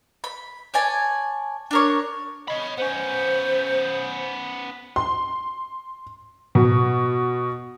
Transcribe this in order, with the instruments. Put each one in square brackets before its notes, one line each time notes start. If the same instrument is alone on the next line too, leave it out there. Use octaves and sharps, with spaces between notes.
[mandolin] B5
C#5 D5 G#5 A5
D4 A#4 C#5
[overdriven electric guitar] C#5 B5 [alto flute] D#5
[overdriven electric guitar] B3 C#4 [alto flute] C5
[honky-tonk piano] C6
B2